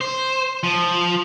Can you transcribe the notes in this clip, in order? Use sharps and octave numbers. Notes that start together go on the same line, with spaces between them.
C5
F3